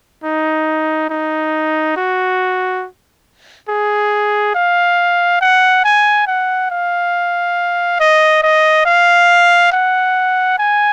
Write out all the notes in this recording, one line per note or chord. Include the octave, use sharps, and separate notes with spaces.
D#4
D#4
F#4
G#4
F5
F#5
G#5
F#5
F5
D#5
D#5
F5
F#5
G#5